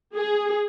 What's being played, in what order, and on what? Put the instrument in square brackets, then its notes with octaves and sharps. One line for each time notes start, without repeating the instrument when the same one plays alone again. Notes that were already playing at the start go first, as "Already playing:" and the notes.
[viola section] G#4